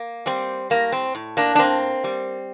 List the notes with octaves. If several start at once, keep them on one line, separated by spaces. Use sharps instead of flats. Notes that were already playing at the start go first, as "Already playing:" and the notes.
Already playing: A#3
G3 C4
A2 A#3
C4
A2
A#3 D4
D4
A#3 C4
G3